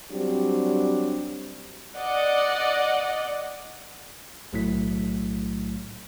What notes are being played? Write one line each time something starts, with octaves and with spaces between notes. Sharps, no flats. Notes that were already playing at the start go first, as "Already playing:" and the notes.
F#3 G3 C4 D4 F#4 G4
D5 D#5 F#5
B1 A2 F#3 A3 E4 B6